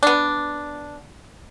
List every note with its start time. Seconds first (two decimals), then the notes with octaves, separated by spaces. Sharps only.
0.03 B3 D4